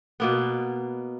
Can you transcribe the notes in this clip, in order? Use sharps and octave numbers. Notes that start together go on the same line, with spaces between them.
B2 A#3 B3